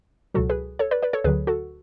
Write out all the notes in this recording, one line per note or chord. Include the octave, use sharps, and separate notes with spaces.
C#2 B2 F#3 F#4 A4
G#4 B4
A4 C#5
B4 D5
B4 D5
A4 C#5
D2 D3 F#3 G#4 B4
F#4 A4